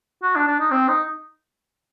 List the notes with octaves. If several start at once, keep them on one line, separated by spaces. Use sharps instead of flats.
F#4
D4
D4
D#4
C4
D#4